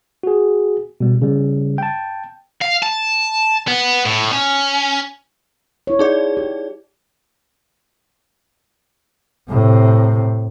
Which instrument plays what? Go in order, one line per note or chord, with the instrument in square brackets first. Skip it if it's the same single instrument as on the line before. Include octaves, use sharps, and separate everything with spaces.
[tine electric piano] F#4 G#4
B2 G3
C#3 G3
G5 A5
[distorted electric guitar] F5
A5
B3
A2
C#4
[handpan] E4 C#5
[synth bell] D#4 G#4 D5
[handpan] G4
[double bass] A2 C3